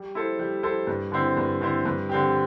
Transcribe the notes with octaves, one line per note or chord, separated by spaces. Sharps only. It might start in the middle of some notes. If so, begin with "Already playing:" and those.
Already playing: G3
E4 A4 C5
G3
E4 A4 C5
G2
D3 C4 E4 C5
G2
D3 C4 E4 C5
G2
D3 C4 G4